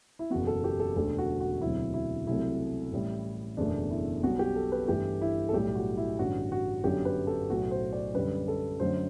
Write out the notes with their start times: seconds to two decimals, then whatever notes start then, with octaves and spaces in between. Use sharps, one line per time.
0.19 E4
0.30 F#1 E2 B2 F#4
0.47 A4
0.64 G4
0.80 A4
0.96 E1 D2 D3 A4
1.18 F#4
1.40 F#4
1.61 E1 D2 C3 F#3 E4
1.94 E4
2.27 C2 C3 F#3 A3 E4
2.92 A1 A2 G3
3.57 F#1 E2 B2 A3 D4
3.91 E4
4.23 B1 B2 G3 F#4
4.39 G4
4.56 A4
4.72 B4
4.88 G1 G2 E3 A3 G4
5.21 E4
5.49 A4
5.53 B1 A2 G3 G4
5.75 F#4
5.97 E4
6.19 A1 G2 D3 F#4
6.52 F#4
6.84 G1 F#2 D3 F#3 G4
7.05 B4
7.27 A4
7.50 B1 A2 F#3 A3 F#4
7.71 C5
7.93 D5
8.14 F#2 D3 G3 B4
8.48 A4
8.80 F#2 D3 F#3 A3 C5